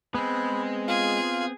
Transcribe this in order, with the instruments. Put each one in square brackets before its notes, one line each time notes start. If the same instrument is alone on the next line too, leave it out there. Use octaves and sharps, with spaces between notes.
[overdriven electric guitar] G#3 [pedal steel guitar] B3 C4 [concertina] B5
[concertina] F4 F5 [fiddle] G#4